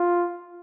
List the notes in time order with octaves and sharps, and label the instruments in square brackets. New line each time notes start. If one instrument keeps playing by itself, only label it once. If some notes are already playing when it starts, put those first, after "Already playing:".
Already playing: [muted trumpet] F4